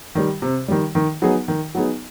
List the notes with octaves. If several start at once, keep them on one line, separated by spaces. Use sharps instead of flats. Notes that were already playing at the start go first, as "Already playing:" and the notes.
D#3 G3
C3
D#3 G3
D#3
F#3 B3 D#4 G#4
D#3
F#3 B3 D#4 G#4